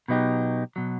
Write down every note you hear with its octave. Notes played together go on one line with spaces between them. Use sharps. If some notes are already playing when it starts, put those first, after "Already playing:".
B2 F#3 B3 D#4 G4
B2 F#3